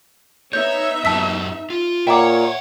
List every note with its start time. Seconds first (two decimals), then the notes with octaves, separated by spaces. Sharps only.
0.53 B3 D#4 C#5 E5 G6
1.05 F#2 F#3 G4 A5 E6 B6
1.70 F4
2.07 A#2 C#5 E5 F#5 G5 A#5 D6